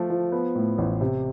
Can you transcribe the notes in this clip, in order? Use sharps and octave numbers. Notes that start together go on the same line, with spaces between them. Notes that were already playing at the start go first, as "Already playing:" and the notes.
Already playing: F3 A3
F3
B3
A2
A1
C3